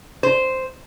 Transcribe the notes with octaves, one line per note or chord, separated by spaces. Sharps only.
C5